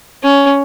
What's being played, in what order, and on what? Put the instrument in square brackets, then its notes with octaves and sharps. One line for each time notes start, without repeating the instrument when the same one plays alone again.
[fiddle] C#4